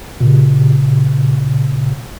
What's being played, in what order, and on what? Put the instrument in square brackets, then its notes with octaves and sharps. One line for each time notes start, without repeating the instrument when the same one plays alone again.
[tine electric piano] A#2 C#3